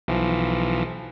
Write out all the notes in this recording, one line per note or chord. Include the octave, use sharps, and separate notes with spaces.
B1 E3 F3